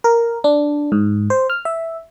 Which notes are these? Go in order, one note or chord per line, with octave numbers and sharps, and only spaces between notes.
A#4
D4
G#2
C5
F6
E5